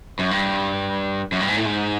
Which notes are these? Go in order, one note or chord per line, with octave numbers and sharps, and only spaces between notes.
F#2
G2
F#2
G2
G#2
A2
G#2